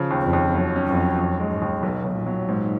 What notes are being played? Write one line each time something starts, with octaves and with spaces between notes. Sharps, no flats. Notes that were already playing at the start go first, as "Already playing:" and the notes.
Already playing: C#3 F3
D#2
F2
D#2
F#3
C#4
F2
F#3
D#2
G#3
G#2
D#2
B1 B2
B1
A#2
F#3
G#2